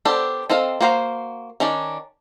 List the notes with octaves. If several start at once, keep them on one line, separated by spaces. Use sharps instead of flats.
B3 D4 G4 A4 C5
C4 A4 D#5 F5
A#3 F#4 C5 F5 A#5
D#3 C#4 D4 D5